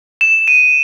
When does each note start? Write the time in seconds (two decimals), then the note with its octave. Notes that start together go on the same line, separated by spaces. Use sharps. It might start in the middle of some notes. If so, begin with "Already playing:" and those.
0.21 E7
0.48 D#7